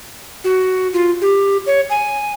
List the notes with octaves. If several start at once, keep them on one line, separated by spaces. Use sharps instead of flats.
F#4
F4
G4
C#5
G#5